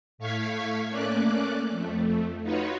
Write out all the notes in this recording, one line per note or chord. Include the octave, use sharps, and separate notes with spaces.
A2 A3 F5 C#6 G#6 B6
A3 A#3 C#4 D5 D6 F#6
F2 A3
D#4 F4 F#4 B4 C#5